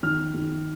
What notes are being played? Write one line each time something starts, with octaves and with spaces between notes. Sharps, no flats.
D#3 F6
D#3